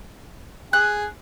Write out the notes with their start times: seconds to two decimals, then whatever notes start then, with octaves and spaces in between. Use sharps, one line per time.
0.73 G#4 F#6